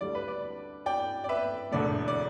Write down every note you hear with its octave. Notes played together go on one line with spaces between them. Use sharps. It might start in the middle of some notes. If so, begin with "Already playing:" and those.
D2 D3 G3 D5
B4
D5
D5 G5
D5
B4 E5
E1 D2 D3 A3 D5
D5